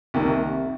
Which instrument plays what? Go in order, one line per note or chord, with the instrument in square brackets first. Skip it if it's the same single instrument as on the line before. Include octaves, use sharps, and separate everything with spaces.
[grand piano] C2 C3 D#3 A#3